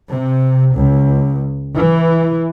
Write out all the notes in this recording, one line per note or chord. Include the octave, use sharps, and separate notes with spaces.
C3
C#2
E3